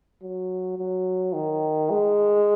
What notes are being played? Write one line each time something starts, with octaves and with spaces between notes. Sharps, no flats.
F#3
F#3
D#3
G#3